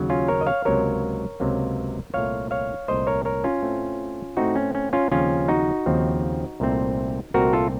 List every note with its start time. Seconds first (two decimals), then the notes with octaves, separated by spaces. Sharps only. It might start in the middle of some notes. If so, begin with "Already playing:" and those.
Already playing: D#2 C#3 F#3
0.10 C#4 F4
0.28 A#4 C#5
0.41 D#5
0.47 C#5 F5
0.65 C#2 C3 F#3 A#3 A#4 C#5
1.40 C#2 C3 F#3 A#3
2.14 C2 A#2 A3 C#5 F5
2.51 C#5 F5
2.88 C2 A#2 A3 C5 D#5
3.07 A#4 C#5
3.25 A#4 C#5
3.44 C#4 F4
3.62 A2 A3 C4
4.37 A2 A3 C4 D#4 F#4
4.56 C#4
4.75 C#4
4.93 C#4 F4
5.11 D#2 C#3 F3 C4 C#4 F4
5.48 D#4 F#4
5.86 D#2 C#3 F3 C4
6.60 C2 A#2 A3 C4
7.34 C2 A#2 A3 C4 F#4 A#4
7.53 F4 A4